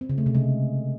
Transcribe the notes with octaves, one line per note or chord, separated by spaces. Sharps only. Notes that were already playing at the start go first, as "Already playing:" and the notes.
C4
C#3
A3
C3
G#3